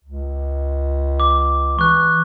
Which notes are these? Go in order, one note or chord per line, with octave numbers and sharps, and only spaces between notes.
C#2
D6
E3 C#6 F#6